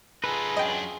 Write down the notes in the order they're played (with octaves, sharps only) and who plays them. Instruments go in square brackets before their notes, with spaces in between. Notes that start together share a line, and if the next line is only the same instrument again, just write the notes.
[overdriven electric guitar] D#4 A4 [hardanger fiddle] F4 G#4 [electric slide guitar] B4
[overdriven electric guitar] F#2 D4 [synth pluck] D#5 G5